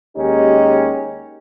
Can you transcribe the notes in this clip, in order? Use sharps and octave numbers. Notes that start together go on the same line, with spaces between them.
D#2 G#3 C#4 D#4 G4